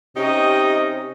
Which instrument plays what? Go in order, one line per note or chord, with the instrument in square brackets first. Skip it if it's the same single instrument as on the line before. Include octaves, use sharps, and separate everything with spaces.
[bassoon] C3 [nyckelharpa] C#4 D#5 [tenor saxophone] D#4 [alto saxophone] G4